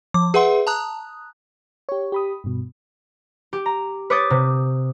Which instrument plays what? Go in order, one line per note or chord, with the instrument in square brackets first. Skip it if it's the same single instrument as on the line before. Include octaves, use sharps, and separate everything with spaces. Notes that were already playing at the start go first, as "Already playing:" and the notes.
[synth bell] F3 D6
G#4 B4 E5 F#5 C6
A5 A#5 D#6 F#6
[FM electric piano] G4 C#5
G4 B5 D#6
G2 B2
[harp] G4
A#5
B4 C#5 D6 D#6 G6 A6
C3